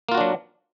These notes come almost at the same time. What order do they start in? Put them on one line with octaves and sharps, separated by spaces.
A#3 F4 F#4 D4 F#3